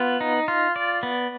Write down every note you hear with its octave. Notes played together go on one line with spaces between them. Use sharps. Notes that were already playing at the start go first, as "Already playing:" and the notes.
Already playing: B3 F4
D#4
F4
D5
B3